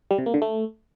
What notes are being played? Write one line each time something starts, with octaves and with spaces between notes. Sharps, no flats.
G3
C3
A#3
D3
A3